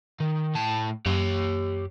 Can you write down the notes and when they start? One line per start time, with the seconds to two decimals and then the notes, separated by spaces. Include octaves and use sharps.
0.20 D#3
0.55 A2 A5
1.06 F#2 G4 C#5